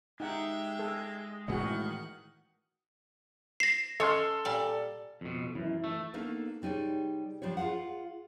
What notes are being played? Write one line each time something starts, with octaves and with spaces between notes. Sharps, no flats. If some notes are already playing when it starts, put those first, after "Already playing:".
G#3 D#4 G4 E5 F#5
G#4 A4
A2 D#3 E3 G#3 F#4 G#4 D#5 F#5
A#6 C7 E7
C#4 A4 C#5 D#5 C6 F6
A#2 G3 D5
F2 B2
F#2 E3 E4
A3
A#3 B3 D4 D#4 A4 A#4
C3 G3 D#4 G#4 C#5
G2 F3 G3 D4 C#5
F4 G#4 A#4 F5 F#5